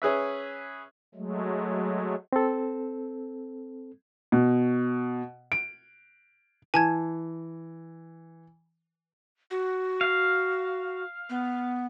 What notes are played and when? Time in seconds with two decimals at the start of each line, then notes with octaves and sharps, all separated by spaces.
0.02 C#4 G#4 B4 E5
1.15 F#3 G#3 A3
2.33 C4 A4
4.32 B2
5.52 D7
6.74 E3 G#5 A5 G#6
9.51 F#4
10.01 F5
11.30 B3